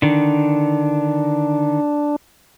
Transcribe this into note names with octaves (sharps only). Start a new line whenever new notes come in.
D3 D#3 D4